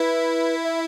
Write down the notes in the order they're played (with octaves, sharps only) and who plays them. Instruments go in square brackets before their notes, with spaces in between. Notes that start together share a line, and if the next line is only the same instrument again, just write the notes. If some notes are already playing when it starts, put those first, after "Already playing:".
Already playing: [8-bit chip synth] E4 [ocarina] B4
[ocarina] E5